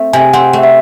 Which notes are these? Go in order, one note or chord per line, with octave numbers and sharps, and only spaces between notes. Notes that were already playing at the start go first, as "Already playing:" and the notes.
Already playing: A3 C4
C3 G#5
C4 F#5
A3
E5